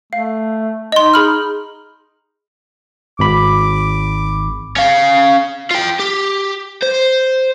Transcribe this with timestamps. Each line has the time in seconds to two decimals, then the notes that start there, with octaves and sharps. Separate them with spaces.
0.13 A3 F5
0.92 D#4 D#5 C6
1.14 G#4 B5 F6
3.19 G#1 B5 D6
4.76 C#4 F5
5.71 F4 G5
5.99 G4
6.83 C5